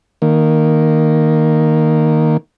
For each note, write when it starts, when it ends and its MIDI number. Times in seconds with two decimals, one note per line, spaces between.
0.22 2.37 51
0.22 2.37 58